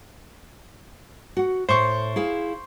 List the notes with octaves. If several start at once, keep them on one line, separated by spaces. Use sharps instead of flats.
F#4 F#5
A2 C5 C#6
E4 G#4 F5